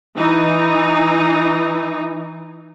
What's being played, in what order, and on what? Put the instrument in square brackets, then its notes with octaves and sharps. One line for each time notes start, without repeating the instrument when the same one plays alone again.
[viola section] E3 D#4